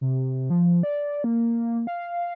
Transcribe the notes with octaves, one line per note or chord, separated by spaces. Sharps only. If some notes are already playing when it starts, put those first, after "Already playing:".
C3
F3
D5
A#3
F5